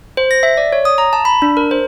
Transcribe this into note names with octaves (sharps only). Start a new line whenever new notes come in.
C5
A#6
E5
D5
C#5
D#6
A#5
A5
B5
D4
A#4
C5